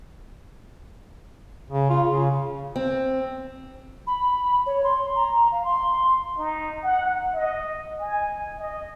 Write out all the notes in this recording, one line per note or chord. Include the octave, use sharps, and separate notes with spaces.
C#3
F4
C#3
C4
B5
C#5
C6
A#5
F5
C6
D#4
F#5
D#5
G#5
D#5